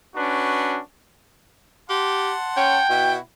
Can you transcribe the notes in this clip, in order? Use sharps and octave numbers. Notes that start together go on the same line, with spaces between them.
C#4 D4 F#4 B4
G4 F#5 A5 C6
C#4 G5
B2 E4 F#4